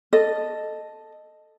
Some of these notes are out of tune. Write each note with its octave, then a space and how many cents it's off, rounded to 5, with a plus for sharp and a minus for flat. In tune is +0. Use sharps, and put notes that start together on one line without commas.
A4 +0 D#5 -10